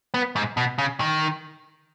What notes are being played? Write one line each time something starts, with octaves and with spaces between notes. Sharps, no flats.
B3
G#2
B2
C#3
D#3